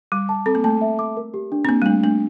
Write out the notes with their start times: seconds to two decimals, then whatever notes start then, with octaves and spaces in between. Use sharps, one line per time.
0.12 G3 D6
0.29 A5
0.46 C4 A4
0.55 A#3
0.64 A3 A5
0.81 E5
0.99 D6
1.17 A#4
1.34 G4
1.52 D4
1.65 C4
1.69 A#3 D4
1.82 G3
1.86 A3 D4
2.03 A3 D4